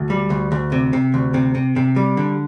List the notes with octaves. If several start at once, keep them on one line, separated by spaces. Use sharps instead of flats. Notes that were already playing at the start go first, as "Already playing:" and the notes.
Already playing: D2
G3
D2
D2
C3
C3
D2
C3
C3
C3
G3
D3